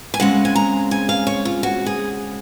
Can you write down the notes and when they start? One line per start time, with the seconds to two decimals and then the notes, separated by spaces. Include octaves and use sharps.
0.14 G#5
0.20 C#3 G#3 C4 F#5
0.45 G#5
0.55 A#5
0.91 G#5
1.09 F5
1.27 C#5
1.45 F4
1.63 F#4
1.86 G#4